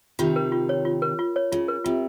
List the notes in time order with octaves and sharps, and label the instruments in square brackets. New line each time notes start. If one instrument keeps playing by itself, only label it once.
[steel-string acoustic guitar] C3 D#3 [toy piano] F4
[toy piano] A#4
F4
C#5
F4
A#4
F4
C#5
[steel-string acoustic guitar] C#3 [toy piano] F4
[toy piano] A#4
[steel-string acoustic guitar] C3 [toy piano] F4